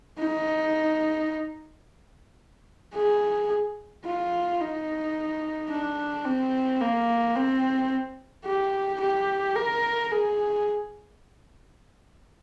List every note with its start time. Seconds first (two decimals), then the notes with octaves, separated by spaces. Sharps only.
0.19 D#4
2.94 G#4
4.05 F4
4.60 D#4
5.70 D4
6.25 C4
6.80 A#3
7.36 C4
8.46 G4
9.01 G4
9.56 A#4
10.11 G#4